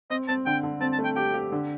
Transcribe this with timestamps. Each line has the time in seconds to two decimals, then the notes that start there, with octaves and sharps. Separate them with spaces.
0.10 C4 D#5
0.28 C4 A5
0.46 D3 G5
0.63 D3
0.81 C4 A5
0.93 A5
0.99 A3
1.04 G5
1.16 G4 G5
1.34 G4
1.52 D3